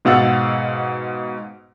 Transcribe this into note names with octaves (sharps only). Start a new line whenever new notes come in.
G#2 B2 F5 F#5 E6 A6